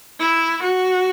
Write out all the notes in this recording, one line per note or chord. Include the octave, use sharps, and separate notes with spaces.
E4
F#4